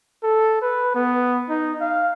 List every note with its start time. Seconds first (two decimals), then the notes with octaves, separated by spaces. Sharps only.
0.23 A4
0.62 B4
0.95 B3
1.50 D#4
1.81 F5